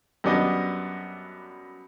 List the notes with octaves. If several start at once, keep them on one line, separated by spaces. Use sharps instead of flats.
F#2 G3 B3 D4 D#5